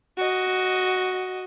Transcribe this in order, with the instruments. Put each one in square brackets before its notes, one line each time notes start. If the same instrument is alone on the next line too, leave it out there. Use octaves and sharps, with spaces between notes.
[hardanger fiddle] F#4 D#5